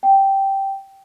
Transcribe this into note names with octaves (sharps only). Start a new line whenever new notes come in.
G5